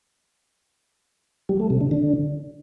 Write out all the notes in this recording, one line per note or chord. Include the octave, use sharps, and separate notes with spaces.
G3
A3
C3
D3
D3